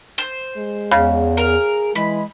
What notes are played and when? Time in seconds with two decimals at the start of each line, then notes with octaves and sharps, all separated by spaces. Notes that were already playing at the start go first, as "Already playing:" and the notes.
0.18 C5
0.57 G#3
0.91 E2 C#3
1.37 G#4 A#4
1.95 E3 G#3 B5